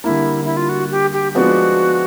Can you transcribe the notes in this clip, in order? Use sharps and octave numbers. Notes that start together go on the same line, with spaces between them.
D3 G3 A#3 E4
E4
F4
F#4
G4
G4
F3 G#3 B3 D4 F4 F#4